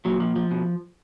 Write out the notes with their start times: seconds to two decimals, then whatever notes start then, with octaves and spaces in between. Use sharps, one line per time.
0.05 A#2 F#3
0.20 F3
0.36 F3
0.51 B2